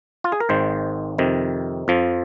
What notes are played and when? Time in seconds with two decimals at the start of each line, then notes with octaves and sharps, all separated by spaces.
0.24 F4
0.32 G#4
0.40 A#4
0.49 G#1 G#2 D#3 C5
1.18 F2 C3 D#3
1.88 F2 F3